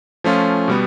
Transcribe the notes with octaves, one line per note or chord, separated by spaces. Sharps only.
F3 A3 C#4 F4
B2 G3 B3